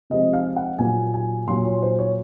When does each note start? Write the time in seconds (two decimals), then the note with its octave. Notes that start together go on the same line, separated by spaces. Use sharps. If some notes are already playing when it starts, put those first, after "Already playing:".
0.10 C3 F3 G#3 C4 D#5
0.33 F5
0.56 F#5
0.78 A#2 F#3 A#3 G#5
1.14 G#5
1.48 A#2 F#3 A#3 C6
1.66 C#5
1.83 C5
1.99 C#5